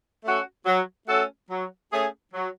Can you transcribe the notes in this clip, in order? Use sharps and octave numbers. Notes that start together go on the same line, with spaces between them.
A3 C#4 F#4 A4
F#3
A3 C#4 F#4 A4
F#3
A3 C#4 G#4
F#3